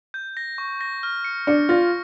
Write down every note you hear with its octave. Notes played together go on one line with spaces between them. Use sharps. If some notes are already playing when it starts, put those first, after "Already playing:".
G6
A#6
C#6
A#6
F6
C#7
D4 C#7
F4 A#6